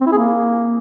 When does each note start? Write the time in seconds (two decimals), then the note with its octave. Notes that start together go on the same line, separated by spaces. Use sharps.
0.01 C4
0.06 E4
0.12 G#4
0.17 A#3